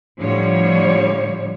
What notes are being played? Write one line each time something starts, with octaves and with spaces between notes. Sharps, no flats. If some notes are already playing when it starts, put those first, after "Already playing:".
A2 D3 F3 G3 C#5